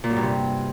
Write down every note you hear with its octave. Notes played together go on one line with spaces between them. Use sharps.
A#2
F#2
G2
C3